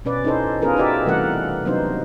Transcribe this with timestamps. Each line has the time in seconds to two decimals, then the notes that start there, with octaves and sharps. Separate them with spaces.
0.05 B2 C#4 B4 D5
0.24 C#4 D#4 E4 A4 C5
0.62 B3 C#4 F4 G#4 A#4 B4
0.76 D#4 F#4 G4 A4 D5 E5
1.06 C3 E3 G3 A3 A#4 F#5
1.65 C3 F#3 B3 D4 D#4 C5